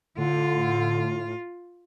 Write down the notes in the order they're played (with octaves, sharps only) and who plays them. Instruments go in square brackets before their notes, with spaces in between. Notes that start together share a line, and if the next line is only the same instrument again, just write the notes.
[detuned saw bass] A2 [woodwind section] D3 [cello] F4